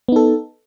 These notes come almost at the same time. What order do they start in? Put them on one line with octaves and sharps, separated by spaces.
B3 D#4 A4